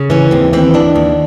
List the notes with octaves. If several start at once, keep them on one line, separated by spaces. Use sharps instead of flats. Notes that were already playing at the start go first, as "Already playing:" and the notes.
Already playing: C#3
E3 C#4
D#2 C4
E3 C4
D#2 D4
D#2